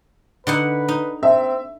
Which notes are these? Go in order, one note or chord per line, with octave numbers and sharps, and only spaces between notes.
D3 D#4 B4 F#5
D#4
C4 E5